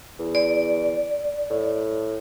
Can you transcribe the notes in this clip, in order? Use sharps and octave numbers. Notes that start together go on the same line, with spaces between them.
E2
D5
A2